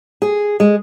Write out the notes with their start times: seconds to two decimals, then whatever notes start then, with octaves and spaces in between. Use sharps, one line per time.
0.22 G#4
0.60 G#3